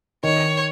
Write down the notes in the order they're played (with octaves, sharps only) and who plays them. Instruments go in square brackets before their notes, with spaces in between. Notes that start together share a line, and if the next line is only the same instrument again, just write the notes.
[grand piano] D#3 [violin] C#5